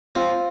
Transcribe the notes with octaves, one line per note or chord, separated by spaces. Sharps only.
C4 F4